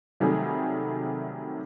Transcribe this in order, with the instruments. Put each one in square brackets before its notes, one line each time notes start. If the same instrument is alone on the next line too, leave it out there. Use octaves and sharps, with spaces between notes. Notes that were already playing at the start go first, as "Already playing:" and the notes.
[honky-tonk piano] C3 D#3 F#3 G3 A3 G#4